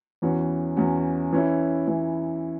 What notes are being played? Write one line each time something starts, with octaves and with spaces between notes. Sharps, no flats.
E2 E3 C#4 F#4
E2 E3 C#4 F#4
E3 C#4 E4
E3 C#4 E4